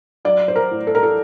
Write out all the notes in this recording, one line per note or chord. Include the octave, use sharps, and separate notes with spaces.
F#3 D5
C5
A#4
A2
A4
A#4
A4